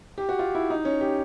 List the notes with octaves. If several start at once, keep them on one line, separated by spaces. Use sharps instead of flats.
G4
F#4
F4
E4
D#4
C#4
G4